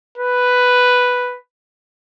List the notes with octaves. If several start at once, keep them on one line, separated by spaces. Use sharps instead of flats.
B4